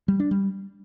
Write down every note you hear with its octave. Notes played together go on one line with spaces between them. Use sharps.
G3
D4
G3